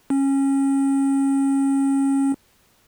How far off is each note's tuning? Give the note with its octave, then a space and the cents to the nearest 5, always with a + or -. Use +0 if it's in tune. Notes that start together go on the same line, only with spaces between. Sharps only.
C#4 -20